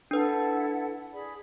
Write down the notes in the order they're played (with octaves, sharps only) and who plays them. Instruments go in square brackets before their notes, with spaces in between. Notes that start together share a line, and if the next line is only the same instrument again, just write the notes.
[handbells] D4 B4 [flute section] E4 A4 F#5
[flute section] G#4 D5 B5